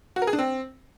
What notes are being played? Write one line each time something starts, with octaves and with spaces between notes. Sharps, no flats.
F#4
A#4
G#4
D4
C4